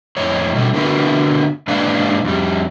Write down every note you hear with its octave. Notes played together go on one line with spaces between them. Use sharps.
F2 A2 C#5
B2 G3 A3
D3 A3 B3 F#4 A#4 B4
G#2 A#3 D4 B4 D5 F5
F2 G3